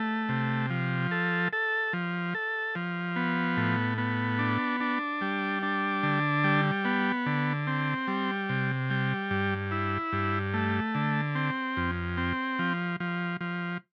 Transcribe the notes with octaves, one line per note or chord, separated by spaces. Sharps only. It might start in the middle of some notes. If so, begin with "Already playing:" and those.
Already playing: A3
C3
F3
A4
A4
F3
A4
F3
B3
A2
B3
D4
D4
G3
D4
D3
G3
B3
D3
C4
G3
C3
G3
G2
E4
G2
A3
D3
C4
F2
C4
F3
F3
F3